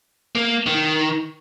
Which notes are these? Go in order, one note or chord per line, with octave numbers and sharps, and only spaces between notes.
A#3
D#3